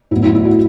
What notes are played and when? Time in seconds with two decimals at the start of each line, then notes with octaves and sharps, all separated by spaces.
0.11 A2 F#3 B3 E4
0.22 E4
0.35 E4
0.45 F#4